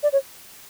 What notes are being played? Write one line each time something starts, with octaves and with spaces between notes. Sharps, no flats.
D5
C#5